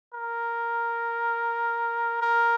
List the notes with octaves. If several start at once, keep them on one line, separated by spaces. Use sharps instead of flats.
A#4
A#4